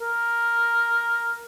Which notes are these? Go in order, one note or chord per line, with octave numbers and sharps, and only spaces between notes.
A#4